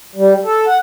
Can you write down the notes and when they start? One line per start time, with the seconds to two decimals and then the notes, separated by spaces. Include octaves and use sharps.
0.15 G3
0.44 A4
0.67 F#5